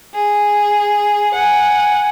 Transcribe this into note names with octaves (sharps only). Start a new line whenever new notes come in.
G#4
F#5 G#5